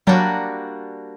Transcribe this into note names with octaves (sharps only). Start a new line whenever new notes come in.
F#3 G3 A#3 D4 F#4